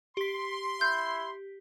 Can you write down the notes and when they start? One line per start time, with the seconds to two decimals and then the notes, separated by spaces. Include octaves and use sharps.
0.17 G4 C6 B6
0.81 E4 G6